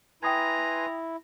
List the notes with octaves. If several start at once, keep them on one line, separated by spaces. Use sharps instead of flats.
E4 B4 G5 G#5 A#5 C6 D#6 G#6